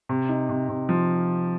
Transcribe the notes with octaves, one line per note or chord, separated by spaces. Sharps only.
C3
D#4
C3
C3
F3